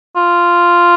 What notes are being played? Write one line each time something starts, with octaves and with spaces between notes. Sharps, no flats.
F4